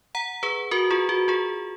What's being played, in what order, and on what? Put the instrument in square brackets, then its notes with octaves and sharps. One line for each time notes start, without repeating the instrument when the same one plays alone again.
[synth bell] F#5 A#5
G#4 B4
F#4 A#4
F4 G#4
F#4
F4 G#4